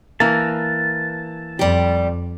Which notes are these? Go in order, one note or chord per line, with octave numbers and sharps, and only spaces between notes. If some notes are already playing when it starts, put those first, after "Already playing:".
E3 A#3 A5
F2 G3 G4